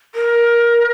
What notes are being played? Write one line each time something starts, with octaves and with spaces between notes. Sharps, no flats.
A#4